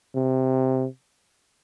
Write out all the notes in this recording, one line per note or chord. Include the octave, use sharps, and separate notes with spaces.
C3